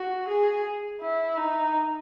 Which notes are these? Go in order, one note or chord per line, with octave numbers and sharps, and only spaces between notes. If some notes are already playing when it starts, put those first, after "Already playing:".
Already playing: F#4
G#4
E4
D#4